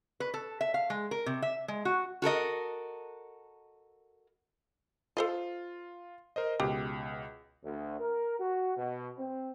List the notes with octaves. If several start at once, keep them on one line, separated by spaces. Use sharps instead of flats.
B4
A4
E5
F5
G#3
A#4
C3
E5
G#3
F#4
F#4 A4 A#4 D#5
F4 A4 C5 D#5
A#4 C5 D#5
C#2 B2 G4
D2
A#4
F#4
B2
C4